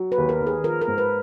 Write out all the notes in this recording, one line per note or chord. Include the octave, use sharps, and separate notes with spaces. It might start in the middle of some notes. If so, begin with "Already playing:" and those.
Already playing: F#3
B4
D#2
A#4
D#3
G#4
F3 A#4
A#4
G#2
B4